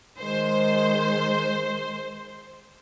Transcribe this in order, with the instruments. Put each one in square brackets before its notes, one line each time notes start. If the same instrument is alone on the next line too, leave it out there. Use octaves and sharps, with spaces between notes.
[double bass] D#3 G#3 [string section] C5